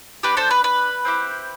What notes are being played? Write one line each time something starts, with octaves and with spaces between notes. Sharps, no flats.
D4 G4 B4
A4 C5
B4
B4
C4 E4 G4